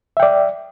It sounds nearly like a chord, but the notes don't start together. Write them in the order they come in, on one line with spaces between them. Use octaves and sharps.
E5 G5 D5